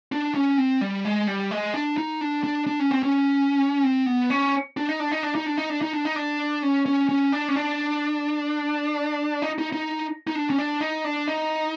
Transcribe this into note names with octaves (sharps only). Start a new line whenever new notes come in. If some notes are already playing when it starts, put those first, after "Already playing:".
D4
C#4
C4
G3
G#3
G3
G#3
D4
D#4
D4
D4
D4
C#4
C4
C#4
C4
B3
C#4
D4
D#4
D4
D#4
D4
D#4
D4
D#4
D4
D#4
D4
D#4
D4
C#4
C#4
C#4
D4
C#4
D4
D#4
D#4
D#4
D#4
D4
C#4
D4
D#4
D4
D#4